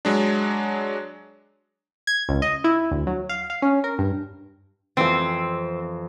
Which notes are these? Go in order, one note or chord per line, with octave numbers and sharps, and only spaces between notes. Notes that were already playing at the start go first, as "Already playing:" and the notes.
F#3 G#3 D4
G#6
C#2
D#5
E4
D2
F#3
F5
F5
C#4
A#4
G2
F2 E3 C4